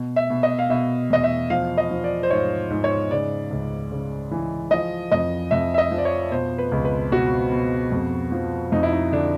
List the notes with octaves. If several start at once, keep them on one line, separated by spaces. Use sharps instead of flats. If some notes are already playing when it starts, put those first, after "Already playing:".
Already playing: B2
E5
B2
D#5
F5
B2 E5
E2 D#5
E5
F3 F5
D#5
F3
D5
C5
G#2 C#5
G#2
C#5
C#3 D5
C#2
C#3
E3
F3 D#5
F2 D#5
F2 E5
E5
D#5
F3
D5
C#5
B2 C5
B4
C#2
B4
B2 F#4
B2
F2
F3
F2 D#4
E4
D#4
D3 D4